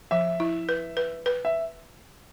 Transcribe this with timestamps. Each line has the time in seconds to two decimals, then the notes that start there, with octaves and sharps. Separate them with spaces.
0.11 F3 E5
0.40 E4
0.69 B4
0.97 B4
1.26 B4
1.45 E5